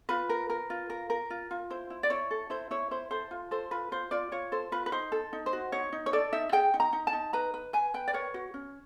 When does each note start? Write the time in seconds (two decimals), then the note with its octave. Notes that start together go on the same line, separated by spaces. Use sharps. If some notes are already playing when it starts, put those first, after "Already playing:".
0.09 F4 B4
0.29 A#4
0.50 A#4
0.70 F4
0.90 A#4
1.10 A#4
1.30 F4
1.51 F4
1.70 E4 C5
1.90 E4
2.03 D5
2.10 E4 C#5
2.31 A4
2.50 E4 C5
2.71 E4 C#5
2.91 E4 C5
3.11 A4 C5
3.31 F4
3.51 A4 C5
3.71 F4 B4
3.92 F4 C5
4.11 F4 D5
4.32 F4 C#5
4.52 A4 C5
4.72 F4 B4
4.86 B4
4.92 D#4 C5
5.12 A4
5.33 D#4
5.46 C5
5.53 F#4
5.72 D#4 C#5
5.92 D#4
6.06 C#5
6.13 A4 D5
6.33 D#4 E5
6.52 G#4 G5
6.74 D#4
6.80 A#5
6.93 D#4
7.07 A5
7.13 D#4
7.33 B4 A#5
7.54 B4
7.73 B4 G#5
7.94 B4 G5
8.08 D5
8.13 A#4 C#5
8.34 F#4
8.54 C#4